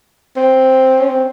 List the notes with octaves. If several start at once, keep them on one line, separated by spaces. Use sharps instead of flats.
C4
C#4
C4